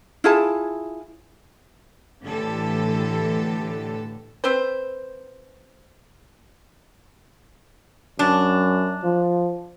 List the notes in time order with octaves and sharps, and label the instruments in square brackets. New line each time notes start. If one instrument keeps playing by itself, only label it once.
[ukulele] E4 F4 G#4 A5
[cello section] A2 D3 E3 G4 A4
[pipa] C4 B4 C5
[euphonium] F#2 [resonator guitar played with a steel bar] D4
[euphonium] F3